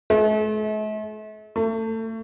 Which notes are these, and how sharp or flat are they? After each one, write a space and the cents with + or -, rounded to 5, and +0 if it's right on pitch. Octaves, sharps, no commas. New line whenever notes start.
A3 -45
A3 +30